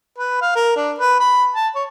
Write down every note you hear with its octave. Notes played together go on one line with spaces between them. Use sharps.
B4
F5
A#4
D4
B4
B5
A5
C#5